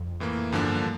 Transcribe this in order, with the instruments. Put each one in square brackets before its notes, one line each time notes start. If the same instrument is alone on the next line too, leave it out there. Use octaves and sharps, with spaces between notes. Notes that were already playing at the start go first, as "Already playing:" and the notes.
Already playing: [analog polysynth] F2
[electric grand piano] A2 E3 A#3
[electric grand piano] E2 D3 F3 A#3 D4 [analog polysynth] G2
[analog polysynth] A2